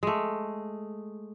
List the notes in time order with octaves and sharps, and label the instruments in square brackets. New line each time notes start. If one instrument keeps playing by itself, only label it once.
[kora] G#3 A3